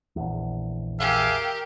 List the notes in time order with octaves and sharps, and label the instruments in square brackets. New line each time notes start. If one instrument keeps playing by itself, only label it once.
[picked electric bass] A#1 E2
[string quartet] G4 A#4 [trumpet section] G#4 E5 F5